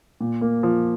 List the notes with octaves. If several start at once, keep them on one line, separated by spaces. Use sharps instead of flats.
A#2
A#3
F3